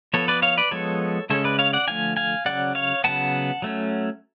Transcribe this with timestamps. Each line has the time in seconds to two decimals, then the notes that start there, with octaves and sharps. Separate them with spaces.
0.14 F3 B3 A4 C#5
0.28 B4 D5
0.42 C#5 F5
0.58 B4 D5
0.71 F3 G#3 B3 A4 C#5
1.30 C#3 G#3 C#4 A4 C#5
1.44 B4 D5
1.59 C#5 F5
1.73 D5 F#5
1.87 D3 F3 A3 F5 G#5
2.17 F5 G#5
2.45 C#3 F#3 C#4 D5 F#5
2.75 C#5 F5
3.04 C#3 F#3 B3 F#5 A5
3.62 F#3 A3 C#4